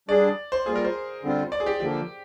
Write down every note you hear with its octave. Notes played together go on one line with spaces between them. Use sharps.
G3 D4 G#4 D5
C5
G3 A#3 F4 G#4
A#4
C5
D3 G3 C4 F4
D5
G#4
G4
D3 F3 A#3 G4